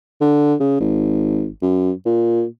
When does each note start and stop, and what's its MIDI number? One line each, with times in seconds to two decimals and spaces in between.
0.21 0.54 50
0.60 0.78 49
0.80 1.49 32
1.62 1.92 42
2.06 2.45 46